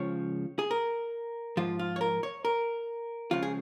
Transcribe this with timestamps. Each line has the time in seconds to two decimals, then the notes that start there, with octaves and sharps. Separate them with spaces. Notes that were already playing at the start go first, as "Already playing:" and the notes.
Already playing: C#2 C#3 F3 C#5
0.59 G#4
0.71 A#4
1.57 G#2 F3 F4
1.79 F4
1.96 C#5
2.01 A#4
2.23 C#5
2.45 A#4
3.31 C#2 C#3 F3 F4
3.43 G#4